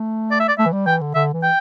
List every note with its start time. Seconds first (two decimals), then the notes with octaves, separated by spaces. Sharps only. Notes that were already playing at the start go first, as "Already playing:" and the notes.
Already playing: A3
0.31 D5
0.40 E5
0.48 D5
0.58 A3 E5
0.66 E3
0.73 G3
0.87 E3 G5
1.01 D3
1.15 D3 E5
1.34 E3
1.43 G5